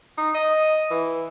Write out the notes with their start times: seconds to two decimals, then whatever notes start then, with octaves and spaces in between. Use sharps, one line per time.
0.18 D#4
0.35 D#5
0.91 E3